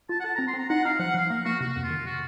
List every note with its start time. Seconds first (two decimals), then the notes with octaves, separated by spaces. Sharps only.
0.09 F4 A5
0.20 F#5
0.24 A4 A5
0.35 C4 A#5
0.47 C6
0.54 C4 A#5
0.69 D#4 F#5
0.84 D#4 F5
0.99 F3 F#5
1.14 F3 F5
1.30 A#3 A#4
1.45 A#3 F#4
1.60 C3 F#4
1.76 F2
1.83 F4
1.90 D#3
2.05 C3 F#4